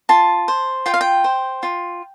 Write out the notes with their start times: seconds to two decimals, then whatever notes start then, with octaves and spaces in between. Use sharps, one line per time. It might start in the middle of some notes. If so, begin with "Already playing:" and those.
0.09 F4 A5
0.48 C5
0.86 F4 G5
0.94 F5
1.01 G5
1.24 C5
1.63 F4